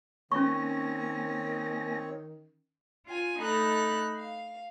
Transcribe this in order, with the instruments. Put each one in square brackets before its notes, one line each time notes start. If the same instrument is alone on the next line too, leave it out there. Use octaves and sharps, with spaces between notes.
[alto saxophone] D#3 [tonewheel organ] A#3 G#5 A#6 [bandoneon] C4 C#5 [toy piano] C#4 C#6
[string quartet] F4 G#5
A3 D#4 A4 B5 F#6
F5